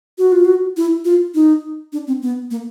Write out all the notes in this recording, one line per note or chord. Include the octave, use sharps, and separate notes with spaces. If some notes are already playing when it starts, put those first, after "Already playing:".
F#4
F4
F#4
E4
F4
D#4
D4
C4
B3
A#3